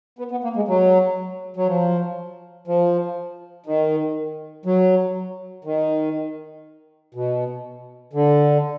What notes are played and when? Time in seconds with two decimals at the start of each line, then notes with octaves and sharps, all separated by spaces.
0.19 B3
0.31 B3
0.44 A#3
0.56 G#3
0.68 F#3
1.56 F#3
1.67 F3
2.67 F3
3.66 D#3
4.65 F#3
5.65 D#3
7.14 B2
8.13 D3